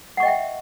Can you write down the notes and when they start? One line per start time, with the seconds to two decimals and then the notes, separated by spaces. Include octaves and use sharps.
0.17 F#5
0.20 C#6
0.23 D#5
0.25 G5
0.28 E5